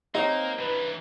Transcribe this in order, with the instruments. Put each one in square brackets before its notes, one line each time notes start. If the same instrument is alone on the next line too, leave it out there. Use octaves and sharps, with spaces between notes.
[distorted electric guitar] A#3 [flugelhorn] C4 [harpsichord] D#4 [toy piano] G4 C#5
[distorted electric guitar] G2 E3 [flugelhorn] B4